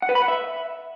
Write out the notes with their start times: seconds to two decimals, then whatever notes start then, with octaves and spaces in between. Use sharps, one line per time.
0.02 F#5
0.09 B4
0.15 B5
0.22 F#5
0.28 E5